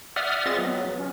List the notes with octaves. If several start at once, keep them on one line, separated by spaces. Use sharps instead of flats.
D5 E5 F#5 D#6 F6
C4 F4 G#4 D#5 E5 A6
F#3 B3
C#4